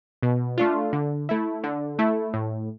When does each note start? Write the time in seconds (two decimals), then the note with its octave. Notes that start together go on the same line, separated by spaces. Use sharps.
0.23 B2
0.58 A3 D4 F4
0.93 D3
1.29 A3 E4
1.64 D3
1.99 A3 E4
2.34 A2